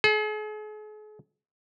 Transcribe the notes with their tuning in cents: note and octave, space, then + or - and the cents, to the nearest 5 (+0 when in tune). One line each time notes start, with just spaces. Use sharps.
G#4 +45